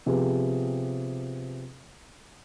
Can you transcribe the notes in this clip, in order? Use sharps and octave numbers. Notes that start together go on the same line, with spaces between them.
C3 F3 B3 G4 G#4